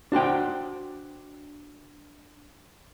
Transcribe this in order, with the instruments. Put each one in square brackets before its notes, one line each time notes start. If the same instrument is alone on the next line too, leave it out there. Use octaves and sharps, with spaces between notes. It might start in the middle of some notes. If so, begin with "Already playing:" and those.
[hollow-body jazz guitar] D4 F#4 C5 G5